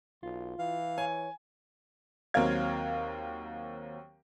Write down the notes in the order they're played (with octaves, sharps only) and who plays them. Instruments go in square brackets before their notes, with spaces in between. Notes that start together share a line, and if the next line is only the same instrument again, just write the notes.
[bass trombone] B1 [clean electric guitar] F4
[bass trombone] E3 [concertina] F5
[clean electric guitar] C#5 [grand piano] G#5
[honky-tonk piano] D#2 F#3 C4 A#4 F5 G#6